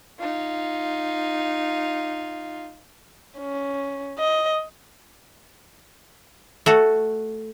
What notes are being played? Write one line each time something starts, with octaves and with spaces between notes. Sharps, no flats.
D#4 F4
C#4
D#5
A3 F#4 A4